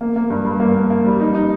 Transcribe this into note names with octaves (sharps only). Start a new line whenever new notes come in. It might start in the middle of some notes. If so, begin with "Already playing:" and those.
A#3
A#3
G2
G2
A#3
A#3
A#3
G3
D#4
D#4